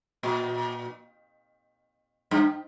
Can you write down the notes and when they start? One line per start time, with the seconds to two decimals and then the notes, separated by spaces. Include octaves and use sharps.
0.23 A#2
2.31 G2